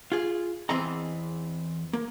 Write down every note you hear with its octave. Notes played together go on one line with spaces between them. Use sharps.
F4 G#4
E2 E3 C4 G#4 D#5 A#5
A#3